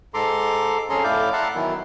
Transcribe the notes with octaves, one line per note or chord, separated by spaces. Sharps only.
G#2 A4 A#5 C6 D6
F2 C#4 G#4 A4 A#5 C6
A2 E4 D5 F5 D6 G6
E5 F#5 A5 A#5 C6 D6
D#3 E3 F#3 B3 E4